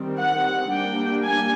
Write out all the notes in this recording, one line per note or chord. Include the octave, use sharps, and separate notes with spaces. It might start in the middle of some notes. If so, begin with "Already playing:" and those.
Already playing: D#3 G3 C4
F#5
G3 A#3 D4 G5
G#5